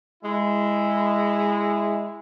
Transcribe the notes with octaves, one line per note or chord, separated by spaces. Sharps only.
G#3 E4